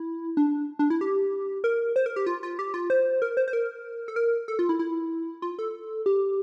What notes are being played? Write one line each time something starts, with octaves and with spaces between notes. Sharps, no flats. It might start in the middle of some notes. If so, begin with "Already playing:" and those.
Already playing: E4
D4
D4
E4
G4
A#4
C5
A#4
G4
F4
F4
G4
F4
C5
A#4
C5
C5
A#4
A4
A#4
A4
F4
E4
E4
F4
A4
G4